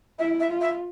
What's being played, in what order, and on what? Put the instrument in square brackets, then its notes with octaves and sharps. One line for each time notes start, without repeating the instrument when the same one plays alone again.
[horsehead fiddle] E4 [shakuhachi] E5
[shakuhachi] E5
[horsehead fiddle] F4
[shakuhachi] E5